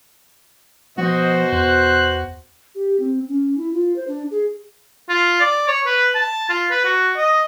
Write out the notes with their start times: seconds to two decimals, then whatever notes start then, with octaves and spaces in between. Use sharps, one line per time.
0.98 B2 F3 F#4 C5 D#5
1.53 E2 F#6
2.75 G4
3.00 C4
3.29 C#4
3.58 E4
3.74 F4
3.96 C5
4.08 D4
4.31 G#4
5.09 F4
5.41 D5
5.68 C#5
5.86 B4
6.15 A5
6.50 F4
6.70 B4
6.85 F#4
7.17 D#5